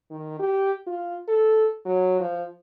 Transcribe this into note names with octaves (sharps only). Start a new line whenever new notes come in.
D#3
G4
F4
A4
F#3
F3